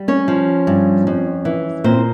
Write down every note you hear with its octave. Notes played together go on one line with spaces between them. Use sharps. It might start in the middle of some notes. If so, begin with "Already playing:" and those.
Already playing: G3
C#4 C#5
F3
G2
F2
E3
A#2 C4 C5